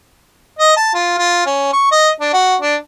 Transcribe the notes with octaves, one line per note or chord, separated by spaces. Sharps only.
D#5
A5
F4
F4
C#4
C#6
D#5
D4
F#4
D4